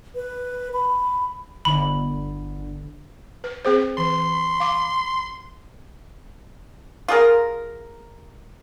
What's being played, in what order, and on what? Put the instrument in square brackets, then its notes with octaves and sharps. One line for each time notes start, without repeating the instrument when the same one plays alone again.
[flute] B4
B5
[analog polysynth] G1 D3 [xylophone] B5
[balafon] B4
C4 G#4 C5
[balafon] E3 [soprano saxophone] C6
[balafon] F5 D6
[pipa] F4 G#4 A#4